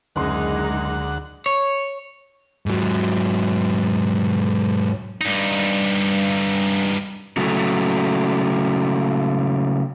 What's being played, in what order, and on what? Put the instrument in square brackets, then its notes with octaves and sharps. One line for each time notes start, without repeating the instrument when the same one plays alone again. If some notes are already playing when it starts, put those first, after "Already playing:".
[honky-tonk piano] F#1 C6 [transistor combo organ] D2 F#5 [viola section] G#3 D#4
[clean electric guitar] C#5
[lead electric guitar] G#2 F#3
[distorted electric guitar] G2 D#4
[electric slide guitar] C#3 F#3 A3